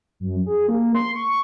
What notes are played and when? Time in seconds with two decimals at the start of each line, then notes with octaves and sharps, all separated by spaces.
0.20 F#2
0.46 G#4
0.69 A#3
0.95 C6
1.15 C#6